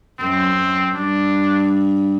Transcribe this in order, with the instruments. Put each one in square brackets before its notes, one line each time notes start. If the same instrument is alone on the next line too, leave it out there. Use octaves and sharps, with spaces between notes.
[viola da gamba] F#2 [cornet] C4
[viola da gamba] F#2
[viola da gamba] G2 [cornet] D4